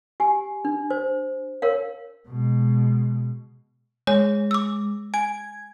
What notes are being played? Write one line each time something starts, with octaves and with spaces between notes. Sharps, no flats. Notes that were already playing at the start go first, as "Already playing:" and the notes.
G4 G#5
D4
C5
A#4 C#5 F5
B2 G#3
G#3 C#5
D6 E6
G#5 G#6